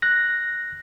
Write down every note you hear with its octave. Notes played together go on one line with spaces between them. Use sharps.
F#6 A#6